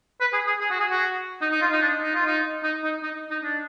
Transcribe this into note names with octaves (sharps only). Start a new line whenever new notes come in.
B4
G#4
G#4
G#4
F#4
G#4
F#4
D#4
D#4
F4
D#4
D4
D#4
F4
D#4
D#4
D#4
D#4
D#4
D4